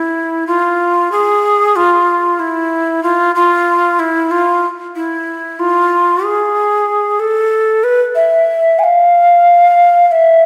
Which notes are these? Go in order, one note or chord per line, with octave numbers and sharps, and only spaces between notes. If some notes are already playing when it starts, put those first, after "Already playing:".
Already playing: E4
F4
G#4
F4
E4
F4
F4
E4
F4
E4
F4
G#4
A4
B4
E5
G#5
F5
F5
E5